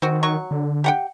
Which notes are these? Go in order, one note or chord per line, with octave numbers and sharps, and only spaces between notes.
D#3 C4 F#4
F#3 C#6
D3
G4 F#5 G5